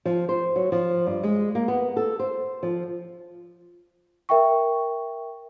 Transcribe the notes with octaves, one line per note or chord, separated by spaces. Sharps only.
F3
C5
F#3
F3
G2
G#3
A#3
B3
A4
C5
F3
A#4 E5 G5 C#6